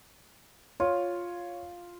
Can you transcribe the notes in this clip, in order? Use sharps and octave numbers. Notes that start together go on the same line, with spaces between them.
F4 C#5